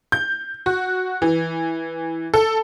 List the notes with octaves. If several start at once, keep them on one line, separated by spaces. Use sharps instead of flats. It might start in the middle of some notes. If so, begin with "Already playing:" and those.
G6
F#4
E3
A4